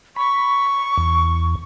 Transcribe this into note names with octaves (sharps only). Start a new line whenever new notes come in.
B5 C#6
E2